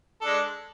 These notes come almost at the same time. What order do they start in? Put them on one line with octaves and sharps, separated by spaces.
A4 D4 G#3